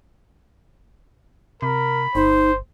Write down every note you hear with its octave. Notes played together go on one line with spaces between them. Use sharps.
C3 A#4 B5
G1 D#4 C5